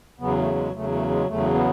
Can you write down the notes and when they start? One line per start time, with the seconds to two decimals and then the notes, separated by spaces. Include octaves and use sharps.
0.20 E2 C#3 F#3 B3
0.38 A3
0.55 G#3
0.74 E2 C#3 F#3 A3
0.91 A3
1.09 G#3
1.28 E2 C#3 F#3 A3
1.54 B3